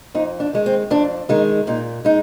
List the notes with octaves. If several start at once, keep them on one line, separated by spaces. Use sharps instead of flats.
F2 D#4
D4
D#3 G#3
C4
F2 D4
D#3 G#3 D#4
A#2 D#4
G#3 D#4